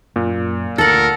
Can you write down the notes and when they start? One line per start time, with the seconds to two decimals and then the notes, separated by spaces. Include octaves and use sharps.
0.16 F#2 A#2
0.78 D2 A4 A#4 F#5